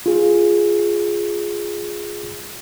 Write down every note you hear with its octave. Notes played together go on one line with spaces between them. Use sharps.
F4 G#4